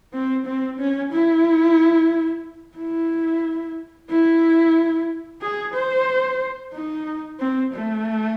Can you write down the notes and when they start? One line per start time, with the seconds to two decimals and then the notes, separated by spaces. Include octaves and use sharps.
0.13 C4
0.46 C4
0.79 C#4
1.12 E4
2.78 E4
4.10 E4
5.41 G#4
5.74 C5
6.74 D#4
7.40 C4
7.73 A3